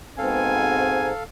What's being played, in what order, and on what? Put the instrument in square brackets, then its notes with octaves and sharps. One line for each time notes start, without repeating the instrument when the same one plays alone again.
[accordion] G#2 [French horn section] B2 B3 C4 [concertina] A4 F5 [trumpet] G#5